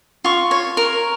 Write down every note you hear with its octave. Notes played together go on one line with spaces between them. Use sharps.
F4 C#6
C#5
A#4